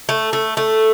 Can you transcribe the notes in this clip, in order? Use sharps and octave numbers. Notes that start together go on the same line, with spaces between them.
A3
A3
A3